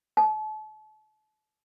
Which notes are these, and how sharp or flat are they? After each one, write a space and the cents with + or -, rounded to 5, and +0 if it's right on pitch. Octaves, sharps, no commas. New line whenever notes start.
A5 -35